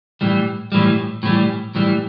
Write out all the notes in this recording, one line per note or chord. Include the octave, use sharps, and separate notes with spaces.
A2 E3 G3
A2 E3 G3
A2 E3 G3
A2 E3 G3